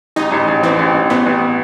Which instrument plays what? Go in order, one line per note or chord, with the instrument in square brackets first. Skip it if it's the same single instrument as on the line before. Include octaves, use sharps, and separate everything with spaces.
[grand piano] A1 [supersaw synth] D#4
[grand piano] A1
A1
[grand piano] E3 [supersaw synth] C4
[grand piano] A1
A1
[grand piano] A1 [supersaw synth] B3
[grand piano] A1